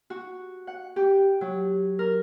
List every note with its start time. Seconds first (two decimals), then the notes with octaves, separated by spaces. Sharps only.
0.10 F#4
0.67 F#5
0.96 G4
1.41 F#3
1.99 A#4